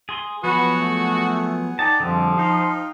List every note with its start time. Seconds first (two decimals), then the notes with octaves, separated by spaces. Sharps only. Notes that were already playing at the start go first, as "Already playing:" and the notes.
0.09 G#4 C6
0.44 F3 F#3 B3 F#4 G#4 B4 F#5 G#5
0.78 A3
1.79 D#4 D5 F#5 G5 A5
2.00 F2 D3 F3 G3 G#4
2.38 D#4 F5 G5 C6